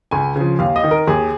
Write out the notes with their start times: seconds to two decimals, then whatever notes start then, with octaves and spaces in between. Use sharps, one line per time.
0.11 C#2 G#5
0.36 C#3 F3
0.59 D#2 F5
0.76 D#5
0.84 D#3
0.91 A#4
1.07 D#2 G#4